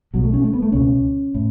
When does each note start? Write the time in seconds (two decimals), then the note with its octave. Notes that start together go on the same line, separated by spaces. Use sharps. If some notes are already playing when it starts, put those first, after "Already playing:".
0.14 B1 B2 F#3
0.24 A3
0.33 C#4
0.44 A3
0.53 B3
0.62 A3
0.72 C#2 B2 C#4
1.34 A2